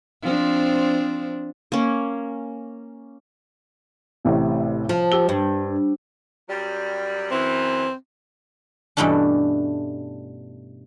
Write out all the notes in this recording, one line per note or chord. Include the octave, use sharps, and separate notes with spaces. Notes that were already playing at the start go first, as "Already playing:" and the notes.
F3 C4 D4
A#3 C#4
A1 A2 C3
F3
G4 E6 G7
G2
F#2 F#3 G3
F#2 E3 C4
G2 B2 E3 A3 C#4 D4